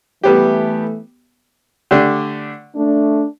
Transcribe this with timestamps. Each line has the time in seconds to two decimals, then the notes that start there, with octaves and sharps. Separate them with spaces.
0.23 E3 G3 A3 B3 G4
1.91 D3 A3 D4 G4
2.75 A3 D4